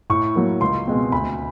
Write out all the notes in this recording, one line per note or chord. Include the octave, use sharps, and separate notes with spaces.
A2 C#6
F#3 A#3
C#2 C6
B2 G#3 C4
D2 B5